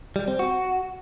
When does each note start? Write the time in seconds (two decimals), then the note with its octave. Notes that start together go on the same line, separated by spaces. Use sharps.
0.16 G3
0.28 C4
0.39 F#4